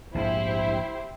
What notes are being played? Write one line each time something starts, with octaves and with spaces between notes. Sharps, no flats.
A#1 G#2 E4 G4 C5